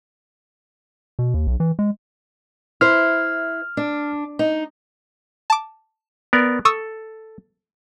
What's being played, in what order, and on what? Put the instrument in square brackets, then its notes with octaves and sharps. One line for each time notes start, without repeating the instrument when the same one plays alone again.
[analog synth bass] B2
D#2
B1
E3
G#3
[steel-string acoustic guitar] E4 C5 [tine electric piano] F6
[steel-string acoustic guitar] D4
D#4
[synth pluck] A5 D6
[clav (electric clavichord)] B3 A#4 D5
[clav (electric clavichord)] A4 [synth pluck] C#6 D#6 E6